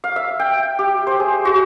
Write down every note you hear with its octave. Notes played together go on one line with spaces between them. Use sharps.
F5
E5
G5
G4
C5
G#4
F#4